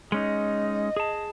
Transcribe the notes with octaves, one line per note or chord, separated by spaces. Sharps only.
G#3 C#4 D#4 D#5
G#4 A5